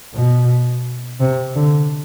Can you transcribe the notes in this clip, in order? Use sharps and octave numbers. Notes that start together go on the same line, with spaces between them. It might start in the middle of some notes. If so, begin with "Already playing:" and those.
B2
C3
D3